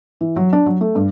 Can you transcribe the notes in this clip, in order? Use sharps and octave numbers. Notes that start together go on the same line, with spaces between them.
E3
F#3
D4
F#3
A3
G2